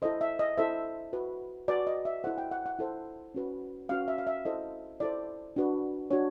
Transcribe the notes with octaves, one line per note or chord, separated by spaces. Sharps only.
E4 A4 C5 D#5
E5
D#5
E4 A4 C5 E5
F#4 B4
F#4 B4 D5
D#5
E5
E4 A4 C5 F#5
G5
F#5
F#5
E4 A4 C5
C#4 F#4 B4
C#4 F#4 B4 F5
E5
F5
E5
E4 A4 C5 D#5
E4 A4 C5 D5
D4 F#4 B4
D4 F#4 C#5